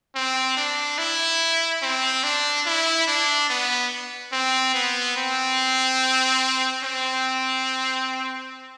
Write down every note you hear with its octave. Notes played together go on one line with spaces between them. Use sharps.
C4
D4
E4
C4
D4
E4
D4
B3
C4
B3
C4
C4